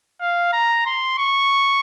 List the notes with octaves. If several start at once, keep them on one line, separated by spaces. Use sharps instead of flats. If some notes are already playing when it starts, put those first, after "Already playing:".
F5
A#5
C6
C#6